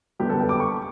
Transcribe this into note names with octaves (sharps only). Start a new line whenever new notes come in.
F#2 D3 G3 B3 G4
A4
G5
D6
C#6